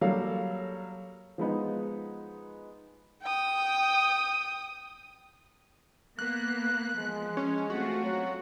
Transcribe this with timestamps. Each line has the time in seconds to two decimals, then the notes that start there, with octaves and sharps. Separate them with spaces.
0.01 F#3 G3 A#3 A4 F5
1.38 F3 G#3 B3 D#4
3.22 G5 D#6
6.19 A#3 B3 F#6
6.98 F3 G#3
7.37 C#4
7.70 A3 C4 F4 F#4
8.03 F#3